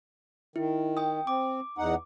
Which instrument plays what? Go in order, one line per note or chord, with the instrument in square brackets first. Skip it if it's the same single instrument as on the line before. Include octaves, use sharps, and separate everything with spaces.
[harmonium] D#3 [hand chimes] E4
[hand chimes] G5 D#6
[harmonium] C4 [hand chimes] D6
[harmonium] E2 D#4 F#5